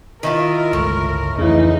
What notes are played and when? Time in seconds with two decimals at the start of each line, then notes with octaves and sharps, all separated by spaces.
0.23 D#3 E4 F4 A#4
0.73 G1 C#2 A2 G#3
1.38 F2 C#3 E3 A3 D#4